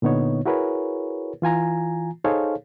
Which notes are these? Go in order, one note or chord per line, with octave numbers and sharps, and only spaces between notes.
A#2 D3 B3 D#4 C#5
E4 F#4 G#4 A#4 B4 C#5
E3 F4 G#5 A#5
D#4 G#4 A4 C5 C#5 F5